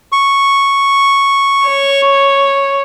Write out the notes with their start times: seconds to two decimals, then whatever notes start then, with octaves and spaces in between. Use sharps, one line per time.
0.12 C#6
1.66 C#5